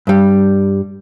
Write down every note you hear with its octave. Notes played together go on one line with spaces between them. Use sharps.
G2 G3